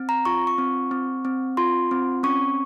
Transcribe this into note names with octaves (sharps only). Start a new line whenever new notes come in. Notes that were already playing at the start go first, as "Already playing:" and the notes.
Already playing: C4
A#5
F4 C#6
C#6
C4
C4
C4
F4 C6
C4
C#4 C#6